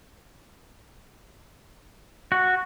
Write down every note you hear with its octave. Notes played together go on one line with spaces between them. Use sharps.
F#4